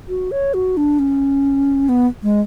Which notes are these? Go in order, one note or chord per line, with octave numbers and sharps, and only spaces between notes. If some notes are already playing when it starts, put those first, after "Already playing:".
F#4
C#5
F#4
D4
C#4
B3
G#3